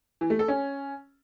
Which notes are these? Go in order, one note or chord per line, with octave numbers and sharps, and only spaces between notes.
E3
A3
A4
C#4